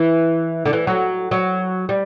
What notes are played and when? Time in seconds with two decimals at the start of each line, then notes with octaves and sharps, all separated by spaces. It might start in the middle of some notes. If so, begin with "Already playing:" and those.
Already playing: E3
0.65 D3
0.73 E3
0.87 F#3
1.31 F#3
1.89 G3